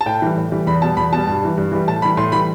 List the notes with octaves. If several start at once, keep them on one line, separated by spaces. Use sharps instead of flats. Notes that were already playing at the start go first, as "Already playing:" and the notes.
A5
A2 G5
E3 G3
A2
E3 G3
E2 B5
B2 G3 A5
E2 B5
B2 G3 A5
G2
E3 G3
G2
E3 G3
A2 A5
E3 G3 B5
A2 C6
E3 G3 B5